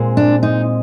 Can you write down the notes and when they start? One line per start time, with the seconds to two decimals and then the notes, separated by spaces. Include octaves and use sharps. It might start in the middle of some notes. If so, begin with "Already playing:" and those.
Already playing: A#2 G#3 C4
0.17 D4
0.43 D#4